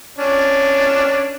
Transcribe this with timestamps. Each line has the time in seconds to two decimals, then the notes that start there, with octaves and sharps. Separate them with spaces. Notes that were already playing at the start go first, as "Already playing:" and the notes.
0.18 C#4 D4